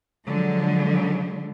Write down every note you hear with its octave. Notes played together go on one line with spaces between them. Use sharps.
D3 F3 F#3 G#3